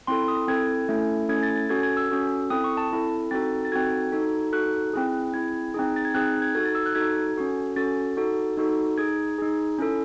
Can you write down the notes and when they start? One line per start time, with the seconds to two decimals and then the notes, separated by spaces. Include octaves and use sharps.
0.07 C4 E4 A4 C6
0.28 D#6
0.48 C4 E4 A4 G#6
0.89 A3 C#4 E4 A4
1.29 A3 C#4 E4 A4 G#6
1.43 A6
1.56 A6
1.69 C#4 F#4 A4 G#6
1.83 G#6
1.97 E6
2.10 C#4 F#4 A4
2.50 C4 E4 A4 D#6
2.64 C#6
2.77 A5
2.91 C4 E4 A4
3.31 C4 D#4 F#4 A4 A6
3.65 A6
3.72 C4 D#4 F#4 A4 G#6
4.12 D#4 F#4 A4
4.53 D#4 F#4 A4 F#6
4.93 C4 E4 G#4
5.34 C4 E4 G#4 G#6
5.74 C4 D#4 G#4
5.96 A6
6.05 G#6
6.15 C4 D#4 G#4 F#6
6.28 F#6
6.42 G#6
6.55 D#4 F#4 A4 G#6
6.65 A6
6.75 E6
6.86 F#6
6.95 D#4 F#4 A4 G#6
7.36 C#4 F#4 A4
7.76 C#4 F#4 A4 A6
8.17 D#4 F#4 A4
8.57 D#4 F#4 A4
8.98 D#4 G#4 G#6
9.38 D#4 G#4
9.79 C#4 E4 A4